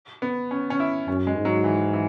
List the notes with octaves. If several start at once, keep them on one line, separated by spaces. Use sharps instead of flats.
B3
C#4
C#4
E4
F#2 C#4
G#3
G#2
F#3
E3
E3